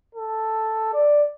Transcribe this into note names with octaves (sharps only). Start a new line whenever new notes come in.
A4
D5